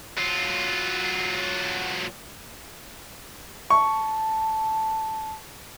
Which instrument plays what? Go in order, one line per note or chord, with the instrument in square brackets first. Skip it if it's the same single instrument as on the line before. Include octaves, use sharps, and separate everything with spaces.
[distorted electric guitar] F#3 F4
[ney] A5 [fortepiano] C#6